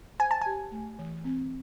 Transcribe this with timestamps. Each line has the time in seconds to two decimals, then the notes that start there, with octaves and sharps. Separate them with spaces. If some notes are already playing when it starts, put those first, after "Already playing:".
0.19 C5 G#5
0.31 A5
0.42 G4 G#5
0.71 A3
0.99 E3
1.24 C4